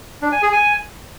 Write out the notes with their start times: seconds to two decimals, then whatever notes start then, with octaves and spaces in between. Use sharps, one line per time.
0.22 D4
0.32 G#5
0.42 G#4
0.52 G#5